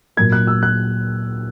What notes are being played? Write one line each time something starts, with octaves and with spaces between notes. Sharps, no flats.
A#2 F#3 A#3 G#6
F#6
E6
F#6